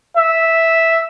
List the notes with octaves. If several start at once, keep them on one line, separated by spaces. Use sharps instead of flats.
E5